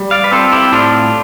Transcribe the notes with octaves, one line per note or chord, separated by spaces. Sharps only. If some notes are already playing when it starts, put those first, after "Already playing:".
Already playing: G3
D5 F5
B4
C4 F4 A4
E4 G4
A2 D4 F4